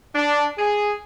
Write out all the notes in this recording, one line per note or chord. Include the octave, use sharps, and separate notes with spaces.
D4
G#4